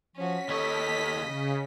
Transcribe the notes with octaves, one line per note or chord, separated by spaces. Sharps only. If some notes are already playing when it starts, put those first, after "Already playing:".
F3 C#4 F#4 B6
D#2 A4 C#5 D#5
C#3